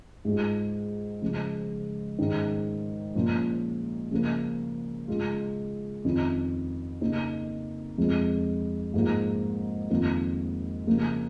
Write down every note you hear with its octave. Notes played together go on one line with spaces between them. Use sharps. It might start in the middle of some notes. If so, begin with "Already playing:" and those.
G#2 G#3 F4
C#3 F3 G#3
G#2 D#3 C#4
A#2 F3 C#4 F4
C#3 F3 A#3
C#3 G#3 F4
F2 D#3 C#4 F4
C#3 A#3 D#4
F2 F3 G#3
G#2 F3 A#3 F4
F2 D#3 A#3 F4
C#3 F3 A#3